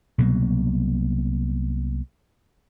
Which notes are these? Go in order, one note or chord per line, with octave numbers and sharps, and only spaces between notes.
C2 B2 F#3 A#3